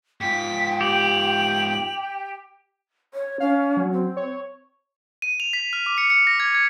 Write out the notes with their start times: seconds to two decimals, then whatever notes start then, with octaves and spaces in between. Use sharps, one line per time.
0.21 G#2 F4 G5 B6
0.81 G4 F#7
3.14 C#5
3.40 C#4 F5
3.77 F#3
3.93 C4
4.17 C#5
5.22 D#7
5.40 F7
5.53 B6
5.73 F6
5.86 D6
5.98 C#7
6.10 C#7
6.27 A#6
6.40 G#6
6.55 G#6